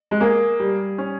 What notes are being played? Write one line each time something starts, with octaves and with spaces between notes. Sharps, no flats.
G#3
A#3 G#4
G3
C#4